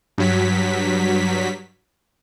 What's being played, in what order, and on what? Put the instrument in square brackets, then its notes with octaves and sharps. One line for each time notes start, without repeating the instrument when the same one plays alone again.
[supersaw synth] G2 F#3 B6